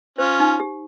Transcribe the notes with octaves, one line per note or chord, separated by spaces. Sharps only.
C#4 F4 C5
D#4
G4